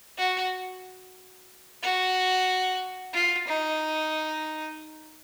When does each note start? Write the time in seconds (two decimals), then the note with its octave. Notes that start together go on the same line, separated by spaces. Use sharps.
0.18 F#4
1.82 F#4
3.13 F4
3.47 D#4